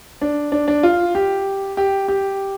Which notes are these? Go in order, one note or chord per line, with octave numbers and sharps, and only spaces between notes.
D4
D4
D4
F4
G4
G4
G4